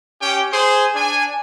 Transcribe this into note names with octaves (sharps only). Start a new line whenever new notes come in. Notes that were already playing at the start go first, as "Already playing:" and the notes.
C#4 G4 G5
G#4 C5
D4 G#5